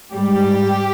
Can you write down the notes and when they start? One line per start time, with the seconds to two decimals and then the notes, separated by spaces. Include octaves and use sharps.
0.12 G#2 G3 G4